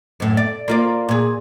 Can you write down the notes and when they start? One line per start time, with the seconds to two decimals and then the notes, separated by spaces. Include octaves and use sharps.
0.20 F#2 A2
0.37 D5
0.68 A#3 F4 D5
1.09 A#2 G#4